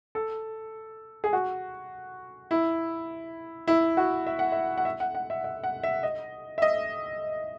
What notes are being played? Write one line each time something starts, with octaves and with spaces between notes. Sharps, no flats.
A4
G#4
F#4
E4
E4
F#4
E5
F#5
E5
F#5
E5
F#5
F#5
E5
E5
F#5
E5
D#5
E5
D#5